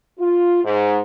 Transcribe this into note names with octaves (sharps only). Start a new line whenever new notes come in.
F4
G#2